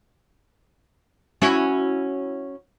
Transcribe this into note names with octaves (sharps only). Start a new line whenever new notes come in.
C#4 E4 F#4